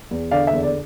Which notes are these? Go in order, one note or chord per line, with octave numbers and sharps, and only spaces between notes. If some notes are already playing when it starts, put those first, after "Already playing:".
E2
D3 D5 F5
E5
E2
D5